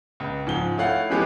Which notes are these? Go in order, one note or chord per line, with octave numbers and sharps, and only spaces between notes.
C#2
G#2 F3 G7
A3 E4 C#5 F5 F#5
E3 F3 G#3 B3 F#4 G4